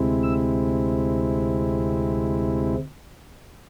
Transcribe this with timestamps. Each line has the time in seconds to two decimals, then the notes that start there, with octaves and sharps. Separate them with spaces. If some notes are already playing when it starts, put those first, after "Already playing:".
Already playing: D2 C3 G#3 C4 E4
0.23 E6